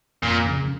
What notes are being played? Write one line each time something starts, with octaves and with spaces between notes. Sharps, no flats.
F2 A#2
C#3